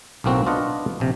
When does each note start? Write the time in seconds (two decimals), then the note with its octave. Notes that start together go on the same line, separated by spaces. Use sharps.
0.24 B1 A2 A#3 C4 F#4
0.46 D4 F4 F#4 B4 D#5 F#5
1.00 A#1 C3